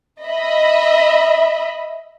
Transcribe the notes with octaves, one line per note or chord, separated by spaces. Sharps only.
D#5 E5 B5